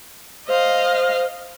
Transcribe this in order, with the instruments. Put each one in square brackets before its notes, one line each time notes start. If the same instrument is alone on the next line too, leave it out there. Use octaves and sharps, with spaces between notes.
[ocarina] C5 [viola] D#5 F5